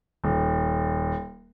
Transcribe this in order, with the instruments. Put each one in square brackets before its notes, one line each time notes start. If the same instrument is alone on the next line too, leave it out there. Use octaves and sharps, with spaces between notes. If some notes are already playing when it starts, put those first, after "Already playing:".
[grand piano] D#1